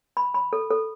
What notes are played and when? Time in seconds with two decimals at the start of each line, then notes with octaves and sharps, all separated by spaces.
0.17 B5
0.34 B5
0.53 A4
0.71 A4